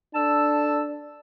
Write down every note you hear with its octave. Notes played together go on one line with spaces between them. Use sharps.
D4 A4 A5 E6